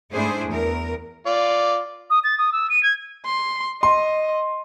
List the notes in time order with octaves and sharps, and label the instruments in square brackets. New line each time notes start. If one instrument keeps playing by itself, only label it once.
[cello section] G#2 A3 D4 E4 G#4 C5
E2 A#4
[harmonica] F4 D5
[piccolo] D#6
A6
D#6
E6
D#7
G#6
[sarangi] C6
[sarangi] D#5 [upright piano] C6